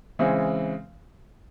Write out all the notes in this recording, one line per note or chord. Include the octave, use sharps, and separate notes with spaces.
C#3 E3 G#3 C4